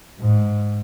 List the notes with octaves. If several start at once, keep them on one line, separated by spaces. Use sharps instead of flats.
G#2